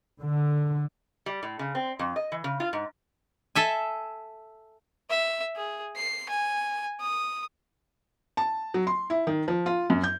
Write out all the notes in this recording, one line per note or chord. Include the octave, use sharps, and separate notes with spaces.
D3
G3
A2
C#3
C4
F2
D#5
E3
C#3
F4
G#2
A4 E5 G#5
E5
G#4
C7
G#5
D#6
A5
F#3
C6
E4
D#3
F3
F4
F#2
G6